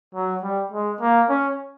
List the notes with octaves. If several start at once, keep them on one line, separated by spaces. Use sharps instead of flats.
F#3
G3
G#3
A#3
C#4